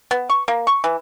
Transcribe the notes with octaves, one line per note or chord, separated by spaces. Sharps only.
B3
C#6
A#3
C#6
E3